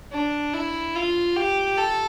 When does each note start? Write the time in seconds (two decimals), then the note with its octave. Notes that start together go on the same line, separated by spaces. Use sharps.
0.12 D4
0.53 E4
0.95 F4
1.36 G4
1.78 A4